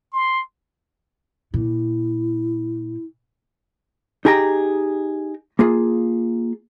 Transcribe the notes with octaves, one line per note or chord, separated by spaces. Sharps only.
C6
A#2 E4
D#4 G4 G#4 G5 A#5
A#3 F4 G#4